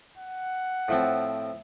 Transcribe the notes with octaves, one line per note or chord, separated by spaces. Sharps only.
F#5
A2 F3 C4